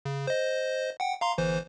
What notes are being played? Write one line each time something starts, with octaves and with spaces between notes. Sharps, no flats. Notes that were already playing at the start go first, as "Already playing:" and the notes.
C#3
C5 D#5
F#5 G5
F5 A#5 C6
G1 E3 C5